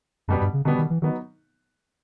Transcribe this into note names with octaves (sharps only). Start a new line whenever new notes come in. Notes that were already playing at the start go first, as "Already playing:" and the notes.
F#2 B2 G3 B3
G2
C#3
B2 D3 G3 B3
D#3
E3
D#3 F#3 B3 D#4